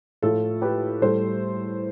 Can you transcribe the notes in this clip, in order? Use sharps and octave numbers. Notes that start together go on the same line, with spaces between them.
A2 F3 F4 A4
G4 B4
A2 G3 A4 C5